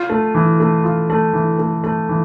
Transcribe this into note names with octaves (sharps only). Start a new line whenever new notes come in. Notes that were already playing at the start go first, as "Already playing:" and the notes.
Already playing: F4
A3
E3
A3
F4
A3
E3
A3
A3
E3